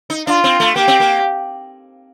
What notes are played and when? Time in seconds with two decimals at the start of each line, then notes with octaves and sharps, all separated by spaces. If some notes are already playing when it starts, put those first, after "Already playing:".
0.10 D#4
0.27 D4 F4
0.44 C4
0.60 A3
0.76 A#3 G4
0.88 C4
1.00 A#3